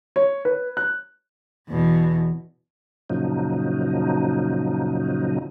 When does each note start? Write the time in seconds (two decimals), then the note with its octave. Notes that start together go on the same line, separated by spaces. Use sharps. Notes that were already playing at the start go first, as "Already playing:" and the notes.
0.16 C#5
0.45 B4
0.77 F#6
1.69 E2 B2
3.10 F#2 A#2 C#3 F3 F#3 D#4